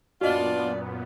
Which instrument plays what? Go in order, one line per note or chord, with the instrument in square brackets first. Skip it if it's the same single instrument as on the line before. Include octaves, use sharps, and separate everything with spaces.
[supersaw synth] F#2 A#2 B3 [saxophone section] D4 F4 [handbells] F#4 D#5 [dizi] D5